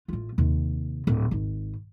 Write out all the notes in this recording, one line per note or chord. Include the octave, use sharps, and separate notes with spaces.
A1 F4
D#2 C3
D1
G#1